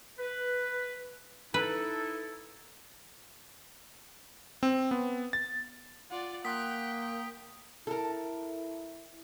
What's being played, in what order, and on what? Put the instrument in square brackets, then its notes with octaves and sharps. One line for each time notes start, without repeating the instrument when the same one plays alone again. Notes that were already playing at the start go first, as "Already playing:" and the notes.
[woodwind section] B4
[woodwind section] D#4 E4 A4 [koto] B4
[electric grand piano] C4
B3
A6
[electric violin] F4 D5 [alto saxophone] F#5
[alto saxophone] A#3 [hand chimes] F#5 C6 F#6 [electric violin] G5 [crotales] D#6 B6
[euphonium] E4 [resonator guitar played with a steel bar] A4 A#4